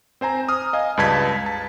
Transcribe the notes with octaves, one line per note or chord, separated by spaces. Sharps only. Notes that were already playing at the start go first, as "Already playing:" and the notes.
C4 C5 G#5 A#5
D#6 F6
D#5 F5 G#5
C#2 G2 B4 A5 G#6 B6
A5